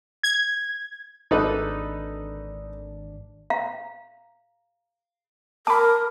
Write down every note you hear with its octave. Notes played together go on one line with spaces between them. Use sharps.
G#6
G#1 D4 D#4 A4 B4
F5 A#5
A#4 A5 B5 D6